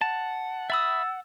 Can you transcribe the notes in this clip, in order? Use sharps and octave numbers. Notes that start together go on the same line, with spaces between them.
F#5 A5
E5 B5 D#6 E6 A6